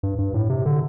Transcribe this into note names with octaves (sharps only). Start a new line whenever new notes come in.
G2
G2
A2
C3
D3